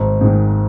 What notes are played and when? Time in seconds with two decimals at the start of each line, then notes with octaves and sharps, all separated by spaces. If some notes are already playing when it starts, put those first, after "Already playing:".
Already playing: G#1
0.21 G#2 D#3